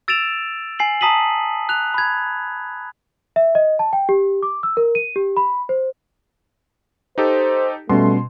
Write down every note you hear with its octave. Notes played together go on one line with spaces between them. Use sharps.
E6 A6 D7 E7 F7
G#5 C7 F#7
A5 A#5 D#6 B6 D#7 F#7
F#6 F7
B5 G#6
E5
D#5
A5
G5
G4
D6
E6
A#4
D#7
G4
B5
C5
D#4 G4 A4 C5
B2 G3 A3 C#4 C6